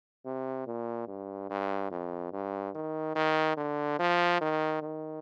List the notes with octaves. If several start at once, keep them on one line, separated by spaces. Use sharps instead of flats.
C3
A#2
G2
G2
F2
G2
D#3
D#3
D3
F3
D#3
D#3